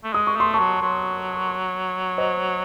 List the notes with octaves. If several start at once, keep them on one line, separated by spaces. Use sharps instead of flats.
A3
G#3 D#6
C#6
A3 C6
A5 C#6
F#3
F#3
C5 D#5